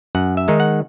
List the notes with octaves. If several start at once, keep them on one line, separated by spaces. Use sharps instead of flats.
F#2 F#5
E5
D#3 G#3 D#4
F#5